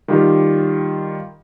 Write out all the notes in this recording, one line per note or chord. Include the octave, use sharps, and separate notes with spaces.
D#3 G3 F4 G4